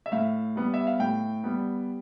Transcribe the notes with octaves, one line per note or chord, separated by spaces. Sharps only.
E5
A2 F5
G3 B3
E5
F5
A2 G5
G3 B3